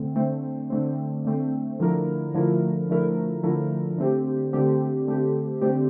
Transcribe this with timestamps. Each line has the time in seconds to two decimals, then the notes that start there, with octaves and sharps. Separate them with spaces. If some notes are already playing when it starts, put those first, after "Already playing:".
Already playing: D3 A3 C4
0.16 D3 A3 C4
0.70 D3 A3 C4
1.25 D3 A3 C4
1.80 D3 F3 A3 E4 A#4
2.35 D3 F3 A3 E4 A#4
2.89 D3 F3 A3 E4 A#4
3.43 D3 F3 A3 E4 A#4
3.98 D3 A3 C4 G4
4.53 D3 A3 C4 G4
5.07 D3 A3 C4 G4
5.62 D3 A3 C4 G4